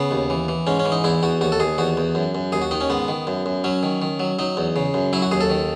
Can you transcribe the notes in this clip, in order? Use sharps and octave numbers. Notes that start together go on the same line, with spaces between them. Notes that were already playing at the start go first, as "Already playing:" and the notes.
Already playing: C#3 B3
D#2
E3
E3
G#2 C#4
C#4
E3
D#4
E2 E4
E2 F#4
D#2 F#4
A4
D#2 G#4
E2 F#4
E2
F#2
F#2
D#2 G#4
F#4
D#3 D#4
C#4
G#2 B3
D#3
F#2
F#2
F#3 C#4
D#3
D#3
F#3
F#3 D#4
E2
C#3
F#2
F#3 E4
F#4
D#2 G#4
A4
D#3